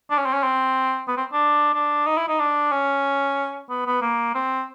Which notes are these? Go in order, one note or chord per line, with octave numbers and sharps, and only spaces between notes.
D4
C#4
C4
C#4
C4
B3
C4
D4
D4
D#4
E4
D#4
D4
C#4
B3
B3
A#3
C4